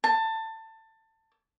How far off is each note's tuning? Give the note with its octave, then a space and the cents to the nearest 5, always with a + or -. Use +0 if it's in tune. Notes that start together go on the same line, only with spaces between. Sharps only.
A5 +20